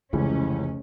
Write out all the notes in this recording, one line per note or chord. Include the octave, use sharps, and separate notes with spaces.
F1 C#2 C#3 E3 C#4